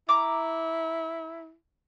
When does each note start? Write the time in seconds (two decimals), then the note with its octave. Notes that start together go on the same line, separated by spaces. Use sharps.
0.09 E4 A#5 D6